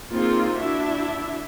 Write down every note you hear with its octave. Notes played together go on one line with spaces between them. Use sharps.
A#3 C4 D#4 F4 G#4
D4 E4 F#4 E5